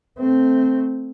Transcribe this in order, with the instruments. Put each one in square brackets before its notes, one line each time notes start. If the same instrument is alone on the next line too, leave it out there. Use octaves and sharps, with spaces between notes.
[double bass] A3 C4